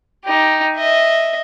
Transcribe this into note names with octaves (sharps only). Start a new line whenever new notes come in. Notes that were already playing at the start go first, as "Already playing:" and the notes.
D#4 G4
D#5 E5